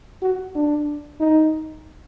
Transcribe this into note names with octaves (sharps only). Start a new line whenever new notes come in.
F#4
D4
D#4